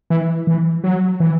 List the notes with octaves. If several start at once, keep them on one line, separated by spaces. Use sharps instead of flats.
E3
E3
F#3
E3